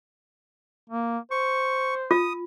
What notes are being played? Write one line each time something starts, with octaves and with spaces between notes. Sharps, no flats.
A#3
C5 C#6
F4 D#6